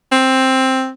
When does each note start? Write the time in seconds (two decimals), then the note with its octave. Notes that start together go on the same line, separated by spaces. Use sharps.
0.12 C4